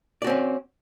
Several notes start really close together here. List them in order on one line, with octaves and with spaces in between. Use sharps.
D5 F#4 C4 C#4